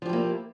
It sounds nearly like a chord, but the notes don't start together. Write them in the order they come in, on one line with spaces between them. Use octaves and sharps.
F3 G4 E4 A#3